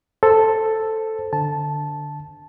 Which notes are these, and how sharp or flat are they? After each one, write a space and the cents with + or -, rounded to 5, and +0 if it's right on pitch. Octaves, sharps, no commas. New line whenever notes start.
A4 +0 C5 +0
D3 +0 A5 -10